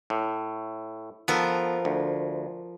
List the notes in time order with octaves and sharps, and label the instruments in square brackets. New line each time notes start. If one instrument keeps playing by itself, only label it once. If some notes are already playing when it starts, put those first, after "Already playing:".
[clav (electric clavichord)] A2
[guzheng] F3 A#4 [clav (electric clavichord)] B3 A4
[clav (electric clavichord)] D2